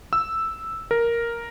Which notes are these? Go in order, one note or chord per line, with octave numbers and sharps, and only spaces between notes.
E6
A#4